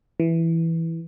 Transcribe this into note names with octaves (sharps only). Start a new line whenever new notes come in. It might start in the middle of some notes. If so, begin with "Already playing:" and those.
E3